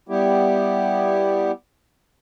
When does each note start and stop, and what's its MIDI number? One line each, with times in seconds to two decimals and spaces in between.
0.09 1.52 55
0.09 1.52 59
0.09 1.52 64
0.09 1.52 67